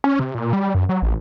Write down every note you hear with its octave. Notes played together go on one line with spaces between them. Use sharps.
C#4
C3
A#2
G3
F#2
F#3
A1